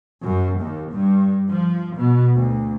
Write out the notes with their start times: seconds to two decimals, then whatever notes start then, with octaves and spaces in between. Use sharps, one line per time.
0.22 F#2
0.60 D#2
0.91 G2
1.50 F3
1.98 B2
2.36 D2